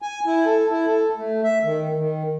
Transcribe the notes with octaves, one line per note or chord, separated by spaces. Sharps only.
G#5
E4
A4
E4
A4
A3
E5
D#3
D#3